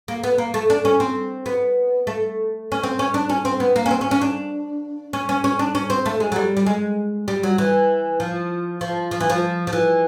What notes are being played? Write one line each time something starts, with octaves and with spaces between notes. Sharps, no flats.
A#3
B3
A#3
A3
D4
C#4
C4
B3
A3
C#4
C4
C#4
D4
C#4
C4
B3
A#3
C#4
C4
C#4
C#4
D4
C#4
C#4
C#4
D4
C#4
C4
A3
G#3
F#3
G3
G3
G#3
G3
F#3
E3
F3
F3
F3
E3
F3
F3
E3